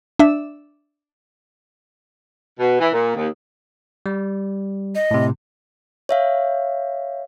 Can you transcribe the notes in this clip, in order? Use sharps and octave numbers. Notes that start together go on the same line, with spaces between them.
D4 E5
B2
E3
A#2
D#2
G3
D#5
A2 C3
C#5 E5 F5